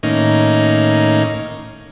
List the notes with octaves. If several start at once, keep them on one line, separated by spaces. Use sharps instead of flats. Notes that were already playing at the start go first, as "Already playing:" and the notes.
A2 D#3 A#3 C#4 D#4